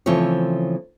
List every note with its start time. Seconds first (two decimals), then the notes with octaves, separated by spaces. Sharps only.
0.06 C#3 E3 F3 A3 C4 C#5